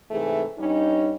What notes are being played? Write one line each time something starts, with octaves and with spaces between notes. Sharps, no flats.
G#2 C3 E3 A3 G#4
G2 G3 C#4 D#4